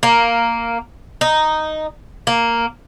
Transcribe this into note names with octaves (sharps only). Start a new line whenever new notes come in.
A#3
D#4
A#3